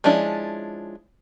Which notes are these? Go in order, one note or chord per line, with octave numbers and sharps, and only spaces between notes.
F3 G#3 C#4 D4 E4